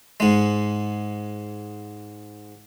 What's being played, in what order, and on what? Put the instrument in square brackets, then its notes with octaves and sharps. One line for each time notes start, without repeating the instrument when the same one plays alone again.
[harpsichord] G#2 G#3